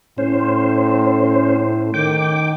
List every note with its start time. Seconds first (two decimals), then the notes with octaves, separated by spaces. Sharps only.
0.18 A2 C#4 C5
1.94 D#3 G5 D6